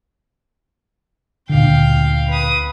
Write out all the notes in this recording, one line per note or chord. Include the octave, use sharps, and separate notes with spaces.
D2 A#2 D3 F5 G5
B4 D#6